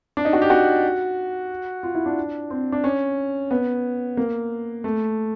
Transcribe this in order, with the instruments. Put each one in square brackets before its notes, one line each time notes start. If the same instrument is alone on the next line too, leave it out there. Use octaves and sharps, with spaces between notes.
[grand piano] D4
D#4
F#4
G4
F#4
F4
E4
D4
C4
D4
C#4
B3
A#3
A3